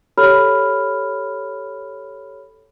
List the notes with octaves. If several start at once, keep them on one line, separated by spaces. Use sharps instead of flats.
G4 A4 C#5 B5 F6